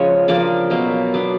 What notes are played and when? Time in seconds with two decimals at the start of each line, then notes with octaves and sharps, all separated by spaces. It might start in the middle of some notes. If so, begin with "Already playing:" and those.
Already playing: C#3 F3 G#3 C#4 C#5
0.28 C#3 F3 A#3 D4 D5
0.70 B2 F#3 A#3
1.14 F#3 B3 D4 D5